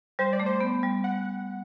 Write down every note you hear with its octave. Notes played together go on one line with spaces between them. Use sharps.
G3 C5
D5
A3
C5
B3
G3
F#5